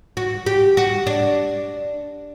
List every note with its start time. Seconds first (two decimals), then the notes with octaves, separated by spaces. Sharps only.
0.17 F#4
0.46 G4
0.77 F#4
1.07 D4